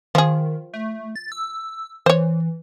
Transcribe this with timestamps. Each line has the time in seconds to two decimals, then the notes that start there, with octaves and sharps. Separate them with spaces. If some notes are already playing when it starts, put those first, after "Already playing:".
0.15 D#3 F3 G#4
0.73 A3
1.16 A6
1.32 E6
2.06 E3 C5 C#5